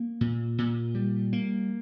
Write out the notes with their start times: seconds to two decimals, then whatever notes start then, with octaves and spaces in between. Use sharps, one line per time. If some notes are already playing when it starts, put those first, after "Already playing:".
Already playing: A#3
0.21 A#2
0.58 A#2
0.95 G3
1.33 A#3